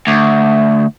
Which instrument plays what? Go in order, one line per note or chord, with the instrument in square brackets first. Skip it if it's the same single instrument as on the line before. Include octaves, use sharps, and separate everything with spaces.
[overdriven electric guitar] D2